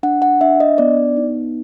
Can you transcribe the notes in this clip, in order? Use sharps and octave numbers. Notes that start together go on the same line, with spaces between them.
D4 F#5
F#5
D4 E5
D#5
B3 D5
D#4